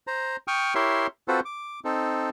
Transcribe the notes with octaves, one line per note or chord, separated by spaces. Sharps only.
C5 A#5
G5 C#6 D#6 F6
E4 G4 A#4 C#5 E5 C6
C4 F4 F#4 A4 B4 C5
D6
C4 D#4 A4